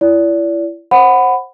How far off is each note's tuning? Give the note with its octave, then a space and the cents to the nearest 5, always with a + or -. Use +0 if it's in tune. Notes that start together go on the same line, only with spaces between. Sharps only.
E4 +30 D5 -30
C5 +20 F#5 +0 B5 +15